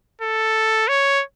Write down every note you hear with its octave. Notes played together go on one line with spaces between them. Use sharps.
A4
C#5